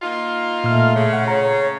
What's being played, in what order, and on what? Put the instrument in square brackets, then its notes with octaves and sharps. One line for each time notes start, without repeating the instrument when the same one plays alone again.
[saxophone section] A#3 D#4 F4
[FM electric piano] A#2 F6 [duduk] A3
[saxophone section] C#3
[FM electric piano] F#5
[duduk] C#5 [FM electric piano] A#5